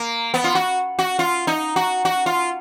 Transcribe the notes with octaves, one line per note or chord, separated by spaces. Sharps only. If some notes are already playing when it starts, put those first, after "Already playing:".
Already playing: A#3
B3
F4
F#4
F#4
F4
D#4
F#4
F#4
F4